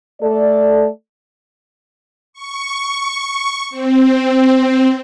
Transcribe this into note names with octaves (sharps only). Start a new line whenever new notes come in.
A3 A4 D5
C#6
C4